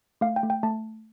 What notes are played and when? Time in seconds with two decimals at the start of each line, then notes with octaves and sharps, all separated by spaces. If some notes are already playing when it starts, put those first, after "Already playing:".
0.21 A3 F5
0.36 G5
0.43 A3
0.50 G5
0.63 A3 A5